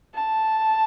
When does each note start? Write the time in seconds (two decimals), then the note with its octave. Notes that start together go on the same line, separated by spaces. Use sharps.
0.15 A5